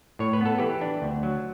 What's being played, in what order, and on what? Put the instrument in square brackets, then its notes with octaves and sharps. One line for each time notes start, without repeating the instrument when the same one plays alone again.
[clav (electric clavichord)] A2 C#5
B4
B3 A4
E3 G4 B4
D4
D2
F#3